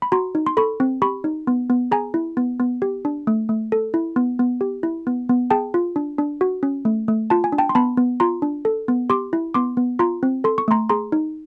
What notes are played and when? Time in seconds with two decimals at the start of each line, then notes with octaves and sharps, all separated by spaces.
0.02 B5
0.12 F#4 A#5 C6
0.35 D#4
0.46 C6
0.57 A4 B5 C#6
0.80 C4
1.02 G4 B5 C#6
1.24 D#4
1.47 B3
1.70 B3
1.91 G#4 G#5 A#5
2.14 E4
2.37 B3
2.60 B3
2.82 G4
3.05 D4
3.27 A3
3.49 A3
3.72 A4
3.94 E4
4.16 B3
4.39 B3
4.61 G4
4.83 E4
5.07 B3
5.29 B3
5.50 G#4 G5 A5
5.74 F4
5.96 D4
6.18 D4
6.41 F#4
6.63 C#4
6.85 A3
7.08 A3
7.30 F4 A5
7.44 G#5
7.52 D4
7.58 G5 A5
7.69 C6
7.75 B3 A5 B5
7.97 B3
8.20 F4 A#5 C6
8.42 D4
8.65 A4
8.88 B3
9.10 G4 C6 D6
9.33 E4
9.54 B3 C6 D6
9.77 B3
9.99 F4 A#5 C6
10.23 C4
10.44 A4 C6
10.58 C#6
10.68 A3 A#5 C6
10.89 G#4 A#5 C6
11.12 D#4